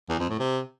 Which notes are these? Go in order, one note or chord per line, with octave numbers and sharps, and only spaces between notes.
E2
F2
A2
C3